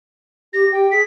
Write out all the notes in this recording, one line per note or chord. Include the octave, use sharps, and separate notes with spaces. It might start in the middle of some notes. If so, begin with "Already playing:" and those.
G4 A#6
G4 G5
G#4 B6